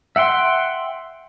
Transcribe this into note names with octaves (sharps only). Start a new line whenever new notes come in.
E5 F#5 G5 C6